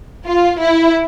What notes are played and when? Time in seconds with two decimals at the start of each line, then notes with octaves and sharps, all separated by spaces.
0.26 F4
0.60 E4